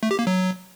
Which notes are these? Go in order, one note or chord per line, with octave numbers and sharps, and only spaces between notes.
A3
G4
A#3
F#3